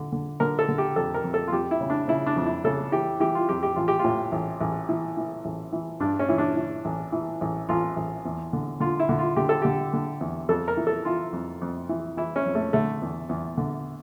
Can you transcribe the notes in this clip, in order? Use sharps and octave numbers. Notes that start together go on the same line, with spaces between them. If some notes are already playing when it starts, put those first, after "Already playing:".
Already playing: D3
D3
D3 A#4
A4
D3
G4
F2 A4
A#4
F2
A4
F4
F2 G4
E4
C#3
D4
C#3 E4
D4
F2
E4
C#3 A4
E3 G4
E3 G4
F4
F2 G4
G4
A1 F4
G4
F4
A2
A1
A1
E3
E3
A1
E3
G2 D4
C#4
E3
D4
E3
A1
E3
A1
A1 F4
A1
E2
D3
D3 F4
E4
D3
F4
D3 G4
A4
D3 G4
D3
E2
F2 A4
A#4
E3
A4
E3 F4
F2
F2
E3
E3 E4
C#4
F2
A3
D3 A3
E2
E2
D3